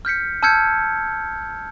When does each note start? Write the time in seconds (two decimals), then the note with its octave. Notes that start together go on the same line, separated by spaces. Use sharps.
0.05 F6 G6 B6 C#7
0.43 A5 E6 F6 G6 G#6 C#7